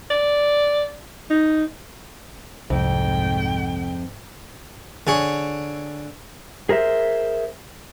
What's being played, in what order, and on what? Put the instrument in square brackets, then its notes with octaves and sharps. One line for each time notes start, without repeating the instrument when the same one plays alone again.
[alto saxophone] D5
D#4
[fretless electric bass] C2 [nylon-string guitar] F2 [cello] G#2 G5
[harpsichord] D3 G#4 C#5
[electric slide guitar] G#4 A#4 C5 E5